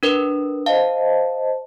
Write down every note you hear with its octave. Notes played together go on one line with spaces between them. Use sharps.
D4 A#4 B4
C5 D#5 F5 A5